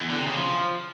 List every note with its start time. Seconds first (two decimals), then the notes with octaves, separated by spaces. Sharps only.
0.01 E2
0.10 D3
0.18 C3
0.27 C#3
0.36 F3